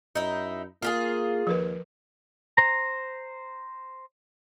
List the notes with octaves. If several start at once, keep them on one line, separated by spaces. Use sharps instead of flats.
F#2 D#4 E4
A#3 F4 G4 G#4
D#2 F3 A#4 B4
C5 A#5